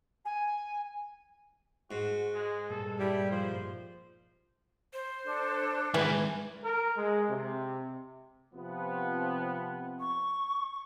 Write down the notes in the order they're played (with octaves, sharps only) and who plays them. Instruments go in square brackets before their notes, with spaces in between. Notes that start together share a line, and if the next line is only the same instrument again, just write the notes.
[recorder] G#5
[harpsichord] G#2 [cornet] F#4
[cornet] G#3
[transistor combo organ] G2 A#2 [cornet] A4
[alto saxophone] G3 [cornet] E4
[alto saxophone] F3 [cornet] C5
[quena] C5
[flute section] D4 A4
[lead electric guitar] D#3 G#3 [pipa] E3
[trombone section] A#4
G#3
C3
[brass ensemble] C3 F3 B3
[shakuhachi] C#6